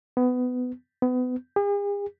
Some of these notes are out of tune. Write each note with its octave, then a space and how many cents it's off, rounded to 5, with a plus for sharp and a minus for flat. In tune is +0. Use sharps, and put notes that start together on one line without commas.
B3 +20
B3 +30
G#4 -45